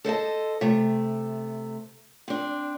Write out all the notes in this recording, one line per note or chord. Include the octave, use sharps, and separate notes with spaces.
A4 C5 D#5 A5
C3 A3
C4 D4